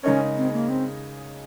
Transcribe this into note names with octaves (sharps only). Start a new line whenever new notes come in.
C#3 G#3 C#4 D#4 A#4 C#5
C4
A#3
C4